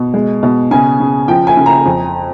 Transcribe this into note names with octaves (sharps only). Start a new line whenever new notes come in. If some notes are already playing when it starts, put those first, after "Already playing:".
Already playing: B2
G#3
B2
C#3 G#5
C#3
F3 G5
G#5
C#3
A#5
F2